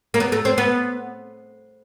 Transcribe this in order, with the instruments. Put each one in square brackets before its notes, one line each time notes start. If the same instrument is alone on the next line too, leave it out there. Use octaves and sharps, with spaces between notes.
[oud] A#3
B3
A3
C4
B3